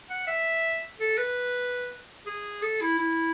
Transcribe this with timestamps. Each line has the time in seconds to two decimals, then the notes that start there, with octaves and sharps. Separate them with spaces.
0.10 F#5
0.27 E5
1.00 A4
1.18 B4
2.26 G#4
2.62 A4
2.81 E4
2.99 E4